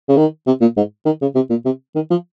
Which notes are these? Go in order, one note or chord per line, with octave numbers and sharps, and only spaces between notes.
C#3
D#3
C3
A#2
G#2
D#3
C#3
C3
A#2
C3
D#3
F3